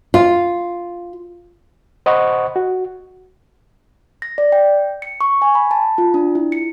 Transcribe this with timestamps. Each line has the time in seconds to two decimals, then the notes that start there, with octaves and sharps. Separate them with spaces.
0.14 F4
2.06 C5 D#5 F#5 B5 C#6
2.56 F#4
4.22 A#6
4.38 D5
4.52 G5
5.02 C#7
5.21 C#6
5.42 G#5
5.55 B5
5.71 A5
5.98 F4
6.14 D4
6.35 E4
6.52 C#7